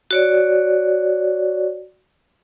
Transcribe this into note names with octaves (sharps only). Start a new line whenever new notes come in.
F#4 C#5 D5